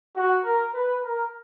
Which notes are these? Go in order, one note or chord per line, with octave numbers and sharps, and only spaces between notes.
F#4
A#4
B4
A#4